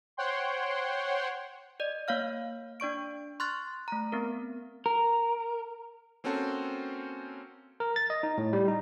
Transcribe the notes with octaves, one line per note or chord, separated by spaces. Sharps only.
C5 C#5 F#5 G5 C6
D5 D#5
A#3 C#5 F5 F6
D4 D5 C#6 D7
C6 C#6 F6 F#6 A6
A3 A#5
B3 C4 A#4
A#4
A#3 C4 C#4 F#4 A4 C5
A#4
A6
D#5
D#4
A2
G3
D#4